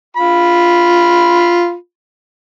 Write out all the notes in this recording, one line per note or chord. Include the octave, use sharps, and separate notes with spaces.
F4 B5